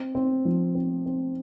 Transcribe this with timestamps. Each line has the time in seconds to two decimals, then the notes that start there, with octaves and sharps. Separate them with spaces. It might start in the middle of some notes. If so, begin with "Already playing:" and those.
Already playing: C4
0.15 C4
0.45 F3
0.75 C4
1.06 C4